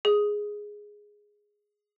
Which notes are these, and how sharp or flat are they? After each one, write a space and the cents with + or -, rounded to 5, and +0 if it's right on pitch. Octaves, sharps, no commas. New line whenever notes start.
G#4 +0 D#6 +5